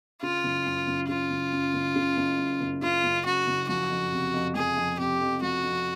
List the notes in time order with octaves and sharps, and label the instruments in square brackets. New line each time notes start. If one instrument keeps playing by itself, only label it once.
[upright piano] C#3 [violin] F4
[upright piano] F#1
F#2
F#1
[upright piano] C#3 [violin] F4
[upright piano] F#1
F#2
F#1
C#3
F#1
F#2
F#1
[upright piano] C#3 [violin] F4
[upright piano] F#1
[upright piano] F#2 [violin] F#4
[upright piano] F#1
[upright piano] F3 [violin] F#4
[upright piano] F2
C3
F2
[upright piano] F3 [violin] G#4
[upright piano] F2
[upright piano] C3 [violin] G4
[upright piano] F2
[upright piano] F3 [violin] F#4
[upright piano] F2